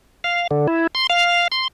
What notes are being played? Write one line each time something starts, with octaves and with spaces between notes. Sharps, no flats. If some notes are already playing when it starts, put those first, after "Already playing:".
F5
D3
E4
C6
F5
C6